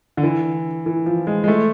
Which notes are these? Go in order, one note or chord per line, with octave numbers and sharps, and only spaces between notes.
D3
E3
E3
F3
G#3
G#3
A3